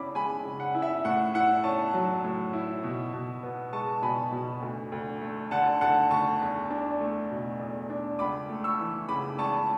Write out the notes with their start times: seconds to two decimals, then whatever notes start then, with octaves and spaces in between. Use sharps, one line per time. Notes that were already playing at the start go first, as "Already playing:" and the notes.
Already playing: C#3 C#4 E4 B5 D6
0.15 G#3 G#5 B5
0.45 C#3
0.60 F#5
0.75 E4
0.82 E5
1.05 A2 F#5
1.34 E4 F#5
1.64 C#4 A5 C#6
1.94 F#3
2.24 A2
2.53 E4
2.83 B2
3.13 B2
3.43 B3
3.73 G#3 A5 C#6
4.02 B2 G#5 B5
4.32 B2
4.62 D2
4.92 D2
5.21 A3
5.51 D3 F#5 A5
5.81 D2 F#5 A5
6.10 D2 A5 C#6
6.41 E2
6.70 D4
7.01 A3
7.31 B2
7.60 E2
7.90 D4
8.19 C#2 B5 D6
8.49 A3
8.64 C#6 E6
8.80 E3
9.09 C#3 B5 D6
9.38 C#2 A5 C#6